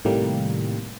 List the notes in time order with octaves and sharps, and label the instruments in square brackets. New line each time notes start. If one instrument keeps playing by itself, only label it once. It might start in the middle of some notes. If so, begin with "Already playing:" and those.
[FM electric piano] A2 C3 D#3 G3 A#3